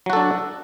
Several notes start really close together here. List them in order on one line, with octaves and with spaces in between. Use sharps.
F#3 F#4 A4 D4